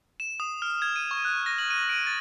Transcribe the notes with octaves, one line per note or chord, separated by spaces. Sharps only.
E7
D#6
F6
G#6
D#7
C#6
F#6
A#6
F#7
D#7
D7
A6